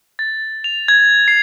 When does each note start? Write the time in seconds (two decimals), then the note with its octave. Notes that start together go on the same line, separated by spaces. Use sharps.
0.19 A6
0.64 F7
0.88 G#6
1.28 C7